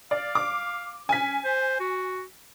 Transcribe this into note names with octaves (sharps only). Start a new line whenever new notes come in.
D5 F5
D6
C#4 G#5 B6
C5
F#4